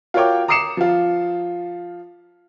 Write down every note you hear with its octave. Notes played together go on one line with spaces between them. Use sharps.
F4 F#4 A#4 C#5 G5 D6
A#5 D6 D#6 C7 C#7 E7
F3 F4